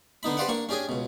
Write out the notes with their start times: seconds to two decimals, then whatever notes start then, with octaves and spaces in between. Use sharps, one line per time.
0.23 D3 B3 D#4 B5
0.37 G4 B4 C5 D5 F5 F#5
0.48 A#3 D4 C#6
0.69 C#4 D4 G4 G#4 G#5
0.89 C#2 B2